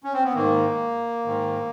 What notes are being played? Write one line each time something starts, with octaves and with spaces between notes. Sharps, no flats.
C#4
C4
B3
G#2 D#3 A#3
G#2 D#3